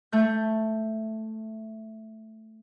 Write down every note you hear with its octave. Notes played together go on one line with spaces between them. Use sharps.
A3 G6